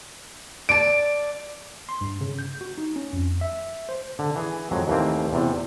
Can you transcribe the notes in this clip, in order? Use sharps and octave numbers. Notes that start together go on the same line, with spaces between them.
D5 A5 D7
C6
G2
C#3
G6
F#4
D#4
C#4
F2
E5
C5
D3
E3 G#4
F2 F#3 G#3
D#2 E3 A3 A#3 C4
E2 C3